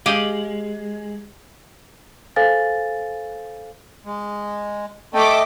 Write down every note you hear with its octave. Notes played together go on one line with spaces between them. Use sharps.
G#3 G4 D#5 F5
A4 C5 F5 G#5 A6
G#3
A3 D#5 G5 D6